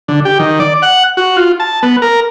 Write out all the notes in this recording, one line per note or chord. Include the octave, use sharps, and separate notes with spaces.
D3
G4
D#3
D5
F#5
F#4
F4
A5
B3
A#4